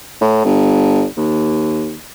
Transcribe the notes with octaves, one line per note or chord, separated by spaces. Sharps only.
A2
G1
D#2